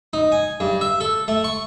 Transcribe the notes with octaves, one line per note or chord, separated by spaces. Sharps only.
D#4
G#5
G2
E5
A4
A3
C#6